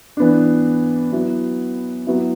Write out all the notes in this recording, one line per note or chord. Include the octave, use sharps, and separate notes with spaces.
E3 B3 D4
F#3 B3 E4
F#3 B3 E4